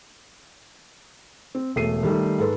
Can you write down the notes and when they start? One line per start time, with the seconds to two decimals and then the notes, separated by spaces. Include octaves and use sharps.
1.55 C4
1.76 E1 A3 C7 D#7
2.03 D#3 G3 A3
2.39 G#2 A4 B4